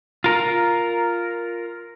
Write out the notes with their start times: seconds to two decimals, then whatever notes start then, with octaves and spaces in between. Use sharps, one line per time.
0.24 F4 A#4